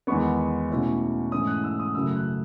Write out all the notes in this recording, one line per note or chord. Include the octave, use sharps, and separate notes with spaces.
E2 D#3 G#3 B3 C#6
B2 A3 C#4 E4
G#2 E3 A3 C#4 D#6
F#6
E6
D#6
F#2 C#3 F#3 A3 E6
F#6